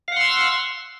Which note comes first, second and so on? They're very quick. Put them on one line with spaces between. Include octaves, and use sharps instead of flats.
F5 F#5 C6 E6